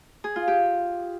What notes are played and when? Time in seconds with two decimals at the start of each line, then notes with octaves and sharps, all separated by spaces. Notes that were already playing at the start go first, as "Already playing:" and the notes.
0.24 G#4
0.36 F4
0.48 G4